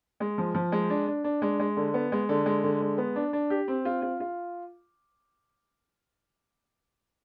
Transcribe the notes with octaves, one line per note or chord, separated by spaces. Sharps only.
G#3
F3
F3
G#3
D4
D4
D4
G#3
G#3
D3
B3
G#3
D3
G#3
D3
G#3
B3
D4
D4
G4
C4
F4
F4
F4